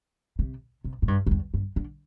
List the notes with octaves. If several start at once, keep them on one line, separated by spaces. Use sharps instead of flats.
C3
C3
A2
G2
G2
E2
G2
D3